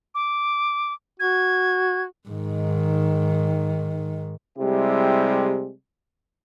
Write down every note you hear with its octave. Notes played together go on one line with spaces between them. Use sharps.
D6
F#4 G#6
G#2 D#3
C3 G3 G#3 E4 G4